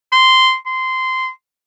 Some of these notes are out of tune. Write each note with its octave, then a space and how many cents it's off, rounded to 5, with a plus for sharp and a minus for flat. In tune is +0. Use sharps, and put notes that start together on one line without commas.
C6 -10
C6 -15